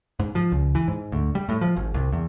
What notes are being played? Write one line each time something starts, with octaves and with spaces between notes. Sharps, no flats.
G#2
F3
C#2
E3
G#2
D2
G3
A2
F3
G#1
C2
E2